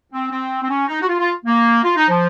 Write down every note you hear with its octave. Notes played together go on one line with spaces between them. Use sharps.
C4
C4
C4
C#4
D#4
F#4
F4
F4
A#3
F4
D#4
F3